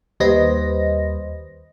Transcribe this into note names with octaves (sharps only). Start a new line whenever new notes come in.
D#2 G3 B4 C5 D#5 A#6